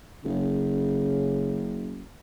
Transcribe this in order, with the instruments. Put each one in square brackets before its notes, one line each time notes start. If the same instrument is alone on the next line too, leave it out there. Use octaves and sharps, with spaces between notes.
[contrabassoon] F#1 [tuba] C#3